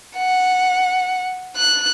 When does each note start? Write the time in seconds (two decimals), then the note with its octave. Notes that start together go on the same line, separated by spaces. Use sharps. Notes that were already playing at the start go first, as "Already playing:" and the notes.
0.17 F#5
1.57 F#6